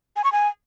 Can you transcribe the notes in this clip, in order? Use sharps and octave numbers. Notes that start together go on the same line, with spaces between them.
G#5
C#6
G#5